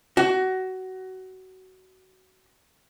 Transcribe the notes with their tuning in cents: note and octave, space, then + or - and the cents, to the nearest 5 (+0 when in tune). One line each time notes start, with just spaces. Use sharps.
F#4 +20